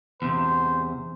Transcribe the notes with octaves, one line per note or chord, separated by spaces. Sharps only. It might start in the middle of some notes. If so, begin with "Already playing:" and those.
E2 C3 C5